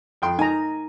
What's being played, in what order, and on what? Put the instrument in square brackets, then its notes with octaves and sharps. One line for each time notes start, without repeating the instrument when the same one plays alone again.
[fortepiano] F2 G5 C6
[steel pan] D#4 A#5 [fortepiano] G#5